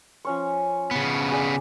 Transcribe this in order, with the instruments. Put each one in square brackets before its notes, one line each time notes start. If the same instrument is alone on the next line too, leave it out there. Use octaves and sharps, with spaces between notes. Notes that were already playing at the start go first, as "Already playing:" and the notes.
[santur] F3 C#4 C#6
[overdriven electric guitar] C#3 B3
[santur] G#4 D5